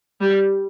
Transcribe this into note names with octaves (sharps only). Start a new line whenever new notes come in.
G3